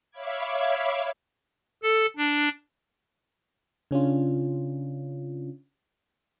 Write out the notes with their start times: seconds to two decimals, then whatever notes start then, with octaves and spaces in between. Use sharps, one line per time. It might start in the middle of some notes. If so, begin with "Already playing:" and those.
0.11 C#5 E5 F5 B5 D6 G#6
1.83 A4
2.17 D4
3.91 C#3 C#4 D4 F4